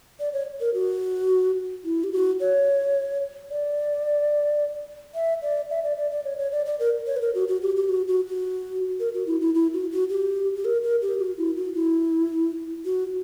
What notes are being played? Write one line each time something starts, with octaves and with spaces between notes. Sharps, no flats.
D5
C#5
A#4
F#4
E4
G4
F#4
C#5
D5
E5
D5
E5
D5
D5
D5
C#5
C#5
D5
D5
A#4
C#5
B4
A#4
F#4
F#4
G4
G4
F#4
F#4
F#4
A#4
F#4
E4
E4
E4
F#4
F#4
G4
G4
A#4
A#4
G4
F#4
E4
F#4
E4
F#4